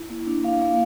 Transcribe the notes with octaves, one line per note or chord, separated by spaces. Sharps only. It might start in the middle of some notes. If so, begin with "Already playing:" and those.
Already playing: E4
A#3
D4
D4 F5
A#3 F5